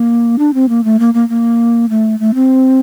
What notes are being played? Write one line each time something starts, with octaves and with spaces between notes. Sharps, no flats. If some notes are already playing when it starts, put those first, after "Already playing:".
Already playing: A#3
D4
C4
A#3
A3
A#3
A#3
A#3
A3
A3
C4